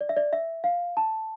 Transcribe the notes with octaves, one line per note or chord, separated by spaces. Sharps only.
D5
E5
D5
E5
F5
A5